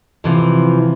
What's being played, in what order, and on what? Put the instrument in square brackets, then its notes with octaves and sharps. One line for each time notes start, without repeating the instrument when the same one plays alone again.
[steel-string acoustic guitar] C3 E3 F3